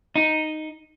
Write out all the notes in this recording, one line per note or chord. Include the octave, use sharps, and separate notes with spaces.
D#4